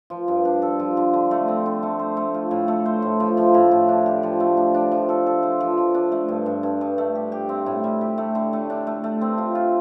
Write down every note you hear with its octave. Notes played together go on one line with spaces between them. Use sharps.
F3
G2
D4
A4
F3
D3
D3
A3
C4
D3
A3
C5
A3
F4
A2
A3
C5
A2
F3
F3
A2
A2
D4
G4
F3
A3
D4
D4
F3
A4
A4
C5
F3
F3
D4
A3
G2
G2
G2
G2
A3
G4
G4
C4
A2
G3
G4
A3
D3
A3
D4
A3
A3
C4
F4
F4